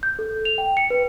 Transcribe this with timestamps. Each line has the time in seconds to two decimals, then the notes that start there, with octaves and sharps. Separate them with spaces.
0.03 G6
0.19 A4
0.45 F7
0.58 G5
0.77 C#7
0.90 B4